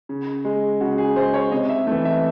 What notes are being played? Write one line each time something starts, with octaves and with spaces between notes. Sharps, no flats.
C#3
G#3
C#3 F#4
G#4
G#3 C5
C#5
C3 D#5
E5
E3 A3
E5